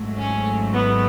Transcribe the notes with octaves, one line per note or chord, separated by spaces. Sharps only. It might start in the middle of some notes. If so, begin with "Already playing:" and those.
Already playing: G#1 G#2 F#3 A3
C#4
B3